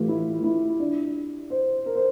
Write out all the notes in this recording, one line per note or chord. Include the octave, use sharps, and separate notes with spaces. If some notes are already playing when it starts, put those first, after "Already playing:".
Already playing: A2 E3 A3 F4 G4
E4
E4
D4
C5
A#4
C5